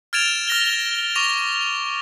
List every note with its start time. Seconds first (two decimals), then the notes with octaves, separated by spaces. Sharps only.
0.13 F6 G#6 A6 D7 E7 F7
0.48 F6 A#6 G7
1.15 C#6 D6 A#6 F7